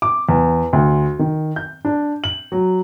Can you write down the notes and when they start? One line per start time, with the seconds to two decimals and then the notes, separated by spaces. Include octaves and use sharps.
0.02 D6
0.29 E2
0.73 D2
1.19 D#3
1.56 G6
1.85 D4
2.24 F#7
2.52 F#3